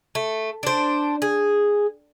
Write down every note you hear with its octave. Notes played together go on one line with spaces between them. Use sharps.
A3
D4 C5
G#4